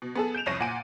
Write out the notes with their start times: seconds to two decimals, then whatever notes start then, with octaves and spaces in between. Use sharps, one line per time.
0.02 B2
0.15 B3 G#4 A4
0.34 G6 D7 E7 F7
0.46 C2 F2 C#5 A#6 D#7
0.60 A#2 F#5 G#5 D7 D#7